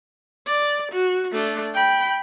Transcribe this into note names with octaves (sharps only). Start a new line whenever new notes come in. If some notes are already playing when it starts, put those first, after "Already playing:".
D5
F#4
A3 D4
G5 B5